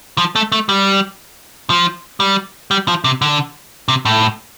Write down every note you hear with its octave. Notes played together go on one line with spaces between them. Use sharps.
F3
A3
A3
G3
F3
G3
G3
F3
C3
D3
C3
A2